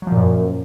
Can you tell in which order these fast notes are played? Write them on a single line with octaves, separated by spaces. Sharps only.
F#3 F3 A#2 F#2